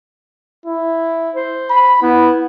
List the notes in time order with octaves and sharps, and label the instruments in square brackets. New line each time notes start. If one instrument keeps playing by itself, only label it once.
[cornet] E4
[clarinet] C5
[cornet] B5
[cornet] B3 [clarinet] E4